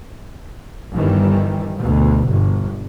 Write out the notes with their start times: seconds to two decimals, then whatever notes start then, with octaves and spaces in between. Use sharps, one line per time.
0.94 G1 D#3 E3 G3
1.79 D2 B2
2.29 G1